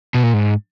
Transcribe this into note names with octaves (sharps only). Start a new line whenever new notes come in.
B2
A#2
G#2